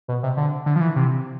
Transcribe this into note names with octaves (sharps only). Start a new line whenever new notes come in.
B2
C3
D3
D3
F3
E3
C3